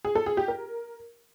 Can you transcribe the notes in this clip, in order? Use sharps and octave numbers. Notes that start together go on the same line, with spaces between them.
G#4
A4
G#4
G4
A#4